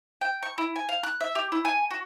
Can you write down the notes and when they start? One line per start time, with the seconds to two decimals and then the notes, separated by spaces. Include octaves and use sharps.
0.21 G5
0.43 C#6
0.58 E4
0.76 G#5
0.89 F5
1.03 F#6
1.21 E5
1.35 G4
1.52 E4
1.65 G#5
1.91 F#4